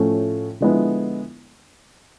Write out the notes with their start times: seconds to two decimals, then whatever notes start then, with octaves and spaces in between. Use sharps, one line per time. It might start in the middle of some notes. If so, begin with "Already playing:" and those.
Already playing: A2 F3 A3 C#4 F4
0.61 D3 F3 G#3 B3 E4